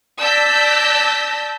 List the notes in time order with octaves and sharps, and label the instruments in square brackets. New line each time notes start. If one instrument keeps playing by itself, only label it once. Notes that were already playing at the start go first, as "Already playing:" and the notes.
[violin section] D5 A5 E6 G6 A#6 B6